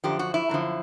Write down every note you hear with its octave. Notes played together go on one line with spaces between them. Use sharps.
F#2 D3 F3 G4
F#4
E4
F#2 D3 F3